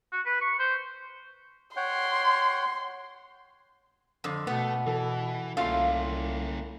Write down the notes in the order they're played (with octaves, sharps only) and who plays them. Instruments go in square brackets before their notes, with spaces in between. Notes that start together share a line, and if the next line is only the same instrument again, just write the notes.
[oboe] F#4
B4
C#6
C5
[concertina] C#5 F#5 G5 [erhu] C6
[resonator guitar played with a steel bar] F2 D3
[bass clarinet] B2 [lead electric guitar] A3 [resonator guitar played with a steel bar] B3
[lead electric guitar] E3 [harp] A4
[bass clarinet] C2 [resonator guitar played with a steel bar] A3 F4 [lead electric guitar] A#3 C#4 [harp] F5 C6